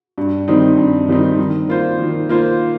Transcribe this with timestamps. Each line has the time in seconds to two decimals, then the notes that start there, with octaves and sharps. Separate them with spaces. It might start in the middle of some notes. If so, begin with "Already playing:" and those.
0.18 G2
0.48 D#3 G3 C4 D#4
0.77 G2
1.08 D#3 G3 C4 D#4
1.39 D#3
1.69 A#3 F4 C5
1.99 D#3
2.29 A#3 F4 C5